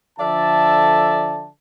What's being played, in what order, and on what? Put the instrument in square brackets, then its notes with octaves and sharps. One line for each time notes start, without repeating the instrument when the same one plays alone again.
[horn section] D3 F3 A4 D5 E5 A5